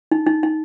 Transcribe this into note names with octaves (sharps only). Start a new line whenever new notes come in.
D#4
D#4
D#4